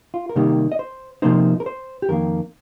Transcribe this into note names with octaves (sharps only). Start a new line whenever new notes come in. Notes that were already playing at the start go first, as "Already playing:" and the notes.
F4
A#4
C3 D#3 G3 A#3 D#4 G4
D#5
C5
C3 F3 A#3 D#4 C5
A#4
C5
G4
F2 D#3 A#3 A#4